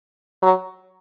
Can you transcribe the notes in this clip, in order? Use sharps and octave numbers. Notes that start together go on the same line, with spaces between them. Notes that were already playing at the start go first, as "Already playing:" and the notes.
F#3